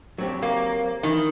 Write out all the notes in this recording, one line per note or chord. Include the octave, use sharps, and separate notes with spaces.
F#3 C4 G4
A#3
D#3 E3